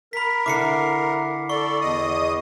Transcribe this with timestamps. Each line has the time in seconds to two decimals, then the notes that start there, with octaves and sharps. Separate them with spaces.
0.13 A#4 B5 B6
0.46 D3 E4 D6 C7 C#7
1.49 A4 D5 C#6
1.81 E2 D#5 D#6